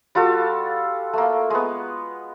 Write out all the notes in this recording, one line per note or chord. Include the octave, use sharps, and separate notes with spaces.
G3 F4 F#4 A4
A3 A#3
G#3 B3